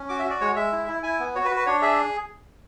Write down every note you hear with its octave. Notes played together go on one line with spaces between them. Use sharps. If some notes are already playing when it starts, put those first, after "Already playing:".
Already playing: C#4
F#4 D6
E5
F#4
D5
G#3 C#5
G#3 E5
E4
E4
E4 G#5
B3
F#4 C#5
B4
F#4
B4
D4 C#5
G#4 E5